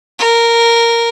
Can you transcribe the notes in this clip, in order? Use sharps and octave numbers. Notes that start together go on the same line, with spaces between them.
A#4